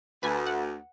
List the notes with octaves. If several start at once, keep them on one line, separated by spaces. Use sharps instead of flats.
D2 B4 G#5
F#5